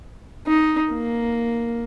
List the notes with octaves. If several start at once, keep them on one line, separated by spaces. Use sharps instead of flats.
D#4
A#3